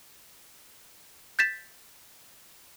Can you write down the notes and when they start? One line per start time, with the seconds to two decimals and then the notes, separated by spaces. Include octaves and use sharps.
1.39 G6 A6 B6 E7